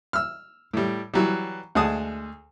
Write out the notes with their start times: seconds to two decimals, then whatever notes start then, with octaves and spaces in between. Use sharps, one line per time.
0.13 E6 F6
0.73 A2 G3
1.14 E3 F#3 G3
1.75 D2 G#3 G#4 F#5 A5 D#6